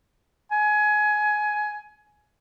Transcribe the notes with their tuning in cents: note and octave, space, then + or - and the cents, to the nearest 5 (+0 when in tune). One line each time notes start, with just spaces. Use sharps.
G#5 +20